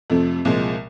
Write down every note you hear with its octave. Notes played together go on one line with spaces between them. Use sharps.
F2 C3 F3 A3
C2 A#2 F3 G#3